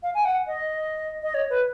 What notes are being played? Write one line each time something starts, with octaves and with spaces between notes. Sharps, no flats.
F5
G#5
F#5
D#5
D#5
C#5
B4